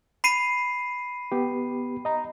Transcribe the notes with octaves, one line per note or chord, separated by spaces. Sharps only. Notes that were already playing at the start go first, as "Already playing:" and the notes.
B5 C7 D#7
B3 G4
D#5 A#5